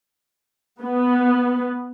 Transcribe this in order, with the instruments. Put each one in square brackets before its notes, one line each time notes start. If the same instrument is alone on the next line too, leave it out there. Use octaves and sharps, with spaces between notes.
[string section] B3